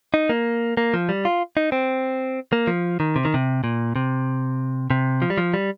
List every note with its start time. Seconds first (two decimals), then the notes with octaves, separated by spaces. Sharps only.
0.14 D#4
0.29 A#3
0.77 A#3
0.94 F3
1.09 G3
1.25 F4
1.57 D#4
1.72 C4
2.53 A#3
2.67 F3
3.00 D#3
3.16 C3
3.25 D#3
3.34 C3
3.64 A#2
3.96 C3
4.90 C3
5.22 F3
5.30 G3
5.38 F3
5.54 G3